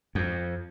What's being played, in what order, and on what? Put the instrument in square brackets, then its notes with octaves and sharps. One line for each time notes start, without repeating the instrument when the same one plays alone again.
[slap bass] F2